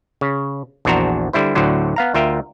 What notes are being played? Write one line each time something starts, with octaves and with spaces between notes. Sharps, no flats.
C#3
A#1 E2 D4 F#4 C5 A#5
D3 G3 E4 C5
D2 A2 D3 F#3 C5
B3 F5 A#5
D2 F4 A#4 E5 G5